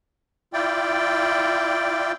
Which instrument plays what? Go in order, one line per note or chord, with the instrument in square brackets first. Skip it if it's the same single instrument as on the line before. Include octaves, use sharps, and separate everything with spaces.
[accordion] E4 F4 D5 G5